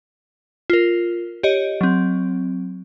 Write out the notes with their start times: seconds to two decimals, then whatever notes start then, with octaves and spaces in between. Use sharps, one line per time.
0.70 F4 A#4
1.43 G4 C#5 D#5
1.81 F#3 C4